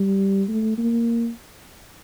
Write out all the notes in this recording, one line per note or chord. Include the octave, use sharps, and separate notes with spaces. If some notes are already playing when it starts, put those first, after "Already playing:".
Already playing: G3
A3
A#3